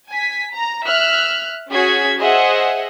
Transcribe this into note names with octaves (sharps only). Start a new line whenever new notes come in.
G#5 B6
A#5
E5 F6 F#6
C#4 F#4 G#4 G#6 B6
G#4 C5 D#5 E5 F#5